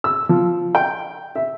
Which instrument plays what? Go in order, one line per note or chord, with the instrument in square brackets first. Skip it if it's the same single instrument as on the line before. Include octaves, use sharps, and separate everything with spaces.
[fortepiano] E6
F3
G5
E5